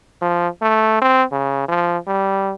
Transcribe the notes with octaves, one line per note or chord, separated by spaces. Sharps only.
F3
A3
C4
C#3
F3
G3